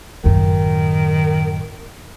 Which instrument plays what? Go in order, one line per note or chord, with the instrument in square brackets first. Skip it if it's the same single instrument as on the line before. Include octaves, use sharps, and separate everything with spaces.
[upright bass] A1 F#2 [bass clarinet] D#3